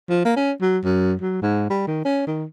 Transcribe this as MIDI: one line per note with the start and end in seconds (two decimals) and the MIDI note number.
0.10 0.24 53
0.25 0.35 58
0.36 0.52 61
0.61 0.79 54
0.84 1.14 42
1.21 1.41 54
1.42 1.66 44
1.70 1.85 55
1.87 2.03 51
2.05 2.22 61
2.27 2.45 51